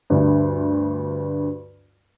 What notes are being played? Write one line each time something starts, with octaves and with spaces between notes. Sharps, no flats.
D2 G2